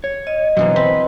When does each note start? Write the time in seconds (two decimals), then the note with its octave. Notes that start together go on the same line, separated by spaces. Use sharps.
0.04 C#5
0.27 D#5
0.57 B2 D3 E3 F#3 A#3
0.76 C4 B4